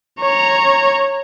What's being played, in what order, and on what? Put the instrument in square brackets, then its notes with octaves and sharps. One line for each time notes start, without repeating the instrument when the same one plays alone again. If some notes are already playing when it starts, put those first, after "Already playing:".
[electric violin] C#5 A#5